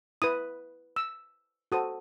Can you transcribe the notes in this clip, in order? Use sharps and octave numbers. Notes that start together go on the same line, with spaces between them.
E4 B4 D#6
E6
F#4 A4 C5 D#6